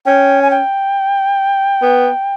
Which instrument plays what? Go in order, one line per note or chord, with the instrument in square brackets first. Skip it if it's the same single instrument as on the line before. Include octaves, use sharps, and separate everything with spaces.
[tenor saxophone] C#4 [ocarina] G5
[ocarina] G#5
G5
[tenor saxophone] B3